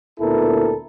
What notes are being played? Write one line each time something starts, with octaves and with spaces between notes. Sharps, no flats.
D2 A#2 B3 E4 A4 A#4